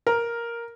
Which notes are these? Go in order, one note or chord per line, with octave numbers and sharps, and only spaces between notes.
A#4